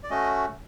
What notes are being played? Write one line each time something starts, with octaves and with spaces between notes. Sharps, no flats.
D5
A3 C#4 F#4 D#5